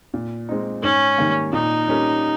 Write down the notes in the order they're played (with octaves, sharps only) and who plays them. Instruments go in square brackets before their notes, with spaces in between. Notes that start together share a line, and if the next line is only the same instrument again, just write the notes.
[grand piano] A#2
G#3 C4 D#4
[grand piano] G#2 [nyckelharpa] C#4
[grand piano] D#3 G3 A#3
[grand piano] A#2 [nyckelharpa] D#4
[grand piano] G3 C#4 G4 A#4